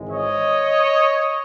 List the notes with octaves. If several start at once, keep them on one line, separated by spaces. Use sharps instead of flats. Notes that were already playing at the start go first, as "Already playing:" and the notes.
Already playing: G#1 G#2 E3 G#3
C#5 D#5